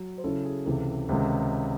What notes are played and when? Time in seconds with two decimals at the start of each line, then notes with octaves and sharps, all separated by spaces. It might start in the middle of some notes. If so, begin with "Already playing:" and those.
Already playing: F#3
0.18 C5
0.24 C#3 F#3 C#4 E4 A4
0.45 G#4
0.66 C#2 C3 E3 A4
1.09 C#2 C3 D#3 G#3 D#4